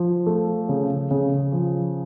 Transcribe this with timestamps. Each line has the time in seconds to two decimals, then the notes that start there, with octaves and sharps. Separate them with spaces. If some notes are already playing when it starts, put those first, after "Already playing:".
Already playing: F3
0.27 A3
0.69 C#3
1.11 C#3
1.52 F3